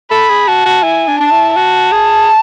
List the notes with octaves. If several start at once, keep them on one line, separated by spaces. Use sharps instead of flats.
A4 B5
G#4
F#4 A5
F#4
E4 G#5
D4
D4 A5
E4
F#4 A5
G#4